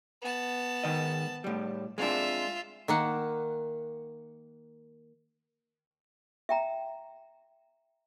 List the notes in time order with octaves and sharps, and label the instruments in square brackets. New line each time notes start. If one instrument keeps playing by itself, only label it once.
[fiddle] B3 A5
[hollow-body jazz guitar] G#2 D#3 D#5
A2 G3
[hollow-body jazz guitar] G#3 C4 D4 [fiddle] F4 E5
[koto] D#3 A#3 F#5
[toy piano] E5 G5 A#5